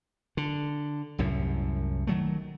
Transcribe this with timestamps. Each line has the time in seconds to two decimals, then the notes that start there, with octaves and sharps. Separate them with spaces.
0.37 D3
1.18 C2 F#2 A2
2.07 D#3 F#3 A3